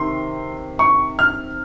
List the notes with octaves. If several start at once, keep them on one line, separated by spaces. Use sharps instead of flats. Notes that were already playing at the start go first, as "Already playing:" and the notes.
Already playing: C3 D#3 C6
C#6
F6